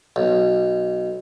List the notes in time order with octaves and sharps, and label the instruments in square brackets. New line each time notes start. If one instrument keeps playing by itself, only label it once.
[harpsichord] B1